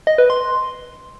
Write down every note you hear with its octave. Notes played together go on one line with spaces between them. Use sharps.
D#5
B4
C6